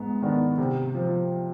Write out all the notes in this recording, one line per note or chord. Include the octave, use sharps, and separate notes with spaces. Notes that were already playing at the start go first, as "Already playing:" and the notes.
Already playing: G#2 B3
D#3 B3 D4
C3
F3